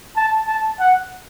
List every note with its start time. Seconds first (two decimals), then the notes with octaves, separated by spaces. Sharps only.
0.17 A5
0.47 A5
0.80 F#5